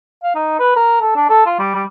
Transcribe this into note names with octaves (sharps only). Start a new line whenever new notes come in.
F5
D#4
B4
A#4
A4
D4
A4
F4
G3
G3